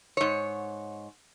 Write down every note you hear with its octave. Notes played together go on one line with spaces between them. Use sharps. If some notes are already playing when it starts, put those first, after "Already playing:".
G#2 C#5